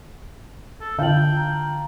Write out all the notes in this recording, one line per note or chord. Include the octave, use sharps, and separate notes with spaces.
A4
D3 F4 F5 G5 A5 F#7
A#5